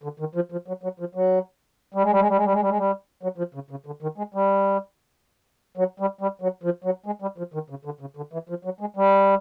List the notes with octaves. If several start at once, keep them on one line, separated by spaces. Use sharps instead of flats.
D3
D#3
F3
F3
F#3
F#3
F3
F#3
G3
G#3
G3
G#3
G3
G#3
G3
G#3
G3
G#3
G3
F#3
F3
C#3
C#3
D3
D#3
G#3
G3
F#3
G3
G3
F#3
F3
F#3
G#3
G3
F3
D#3
C#3
D3
C#3
D3
E3
F3
F#3
G#3
G3